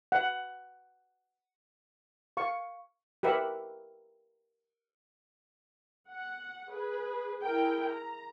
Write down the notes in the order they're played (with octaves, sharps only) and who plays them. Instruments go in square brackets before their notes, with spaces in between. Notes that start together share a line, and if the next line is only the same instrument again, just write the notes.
[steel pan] F#5
F5 C#6
G4 A#4 B4 E5 F#5
[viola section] F#5
G#4 B4
E4 G#4 A#4 G5
A#5